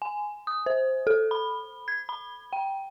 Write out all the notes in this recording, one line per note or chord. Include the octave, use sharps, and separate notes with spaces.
G#5
D#6
C5
A4
B5
G#6
B5
G5